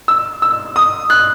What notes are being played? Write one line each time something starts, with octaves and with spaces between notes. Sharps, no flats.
E6
E6
D#6
F#6